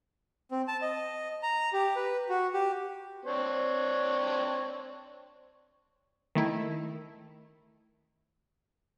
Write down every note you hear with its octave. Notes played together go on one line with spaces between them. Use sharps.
C4
A5
D#5
A#5
G4
B4
F#4
G4
C4 D4 C#5
D#3 A3 E4